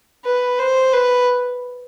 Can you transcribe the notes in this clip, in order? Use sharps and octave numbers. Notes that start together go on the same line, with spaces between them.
B4
C5
B4